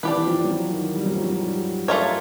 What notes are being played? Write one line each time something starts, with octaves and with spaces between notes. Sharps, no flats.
E3 D4 G4 B4
E3
F3
F#3
F3
D#3
G3
F#3
F3
F#3
G3
A3 C4 F4 A#4 C#5